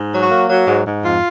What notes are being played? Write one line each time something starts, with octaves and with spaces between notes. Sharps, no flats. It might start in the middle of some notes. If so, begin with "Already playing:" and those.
Already playing: G#2
F#3
F#4
A#3
F#3
G#2
G#2
F2 F4